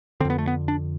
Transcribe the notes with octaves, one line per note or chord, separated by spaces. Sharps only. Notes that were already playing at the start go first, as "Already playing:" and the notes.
F2 D3 C4
B3
A3
B3
D4